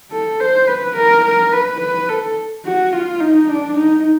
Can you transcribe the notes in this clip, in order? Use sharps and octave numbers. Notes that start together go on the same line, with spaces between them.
A4
C5
B4
A#4
A#4
B4
B4
A4
F#4
F4
D#4
D4
D#4